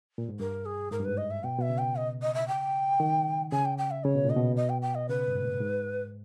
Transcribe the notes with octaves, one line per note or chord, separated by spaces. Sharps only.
A#2
G#2
G2 A#4
G#4
G#2 A#4
G2
G#2 B4
D#5
E5
B2 G5
B2 E5
C#3
G5
D#5
D#5
E5
G5
D#3
C#3 G#5
G5
G5
E5
C#3 C#5
B2
A#2
D#5
B2
D#5
G5
G5
D#5
C#3 B4
G2
G#2
A#2
G#2